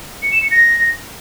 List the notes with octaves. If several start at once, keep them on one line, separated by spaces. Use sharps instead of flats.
C#7
E7
C#7
A#6